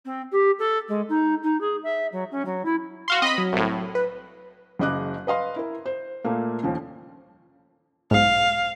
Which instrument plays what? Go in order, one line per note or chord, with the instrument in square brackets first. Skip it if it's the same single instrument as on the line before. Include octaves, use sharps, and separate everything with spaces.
[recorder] C4
G4
A4
G#3
D#4
D#4
G#4
E5
F#3
C#4
F#3
E4
[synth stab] F#4 F5 C6
[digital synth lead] C4 [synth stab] D#5 B5
[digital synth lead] F#3
[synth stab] C2 A2
[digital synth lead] B4
[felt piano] F#1 C#3 D#5 D6 F#6
B4 D#5 F5 C6
E4 A#4
C5
A#2 A3 A#3
D#2 F3 C#4
[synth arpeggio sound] B1 G#2 [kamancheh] F5